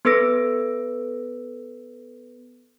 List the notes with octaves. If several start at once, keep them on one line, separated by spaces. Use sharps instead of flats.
B3 A4 B4 E6 A#6 D7